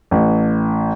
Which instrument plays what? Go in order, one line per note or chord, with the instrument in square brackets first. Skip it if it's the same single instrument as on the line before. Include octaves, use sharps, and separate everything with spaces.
[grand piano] A1